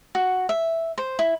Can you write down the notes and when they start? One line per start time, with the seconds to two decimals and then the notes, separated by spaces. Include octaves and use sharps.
0.15 F#4
0.49 E5
0.98 C5
1.19 E4